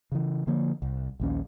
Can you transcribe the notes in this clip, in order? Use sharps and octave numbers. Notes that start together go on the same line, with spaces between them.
C#3 E3
D3 F3 A#3
C2
A#1 D#2 C#4